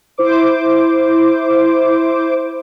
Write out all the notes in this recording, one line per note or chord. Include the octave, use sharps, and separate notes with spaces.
E4 C5 D6